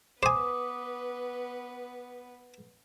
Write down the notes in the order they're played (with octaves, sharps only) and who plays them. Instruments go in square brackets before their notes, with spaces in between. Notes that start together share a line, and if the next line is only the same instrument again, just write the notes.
[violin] B3 B4 [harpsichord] C5 G#5 [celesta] D6 D#6